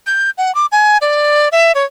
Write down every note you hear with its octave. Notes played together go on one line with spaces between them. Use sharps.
G6
F#5
D6
G#5
D5
E5
C#5